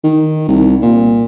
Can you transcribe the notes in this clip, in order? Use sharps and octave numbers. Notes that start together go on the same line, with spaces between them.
D#3
C2
A#2